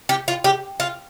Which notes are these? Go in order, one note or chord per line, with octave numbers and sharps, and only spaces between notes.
G4
F4
G4
F4